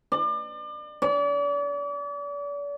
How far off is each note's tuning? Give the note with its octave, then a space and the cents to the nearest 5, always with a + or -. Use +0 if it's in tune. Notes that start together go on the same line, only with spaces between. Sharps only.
D5 +35
D5 -40